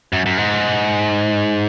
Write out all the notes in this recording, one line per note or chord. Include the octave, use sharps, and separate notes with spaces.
F#2
F#2
G#2